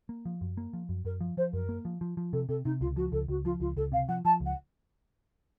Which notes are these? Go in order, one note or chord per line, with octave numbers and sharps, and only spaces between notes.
A#3
F3
F#2
A#3
F3
F#2
F#2 A#4
F3
F3 C5
F#2 A#4
A#3
F3
F3
F3
C3 A4
C3 A4
C3 D#4
C#2 F4
F3 F#4
C#2 A4
C#2 F#4
F3 F4
C#2 F4
C#2 A4
C3 F5
F3 F#5
F3 A5
C#2
F#5